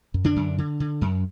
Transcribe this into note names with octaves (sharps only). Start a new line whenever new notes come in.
F#2
D3 D4
F#2
D3
D3
F#2